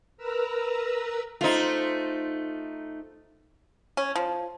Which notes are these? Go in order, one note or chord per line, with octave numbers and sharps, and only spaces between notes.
A#4 B4 A#5 E6
A3 D#4 F4 C5
C#4
F3